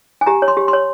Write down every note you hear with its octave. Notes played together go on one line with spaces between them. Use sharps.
G#5
G4 A#5
C#5
C6
G4
C6
C#5